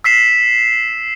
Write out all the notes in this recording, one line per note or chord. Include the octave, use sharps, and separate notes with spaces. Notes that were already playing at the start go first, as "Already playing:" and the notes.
E6 B6 C7 E7